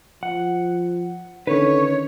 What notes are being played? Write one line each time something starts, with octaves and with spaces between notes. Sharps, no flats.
F3 F#5
D3 D#3 C#4 B4 C#5